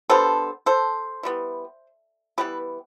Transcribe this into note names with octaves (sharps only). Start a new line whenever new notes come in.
D3 G3 B3 A4 C5
A4 C5
E3 G3 B3
E3 G3 B3 G4 B4